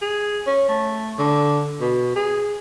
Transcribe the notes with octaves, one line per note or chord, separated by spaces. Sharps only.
G#4
C#4
A3
D3
B2
G#4